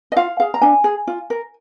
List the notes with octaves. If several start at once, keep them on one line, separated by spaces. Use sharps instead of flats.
D#5
F4 F5
G#4 F5
A#5
D4 G#5
G#4
F4
A#4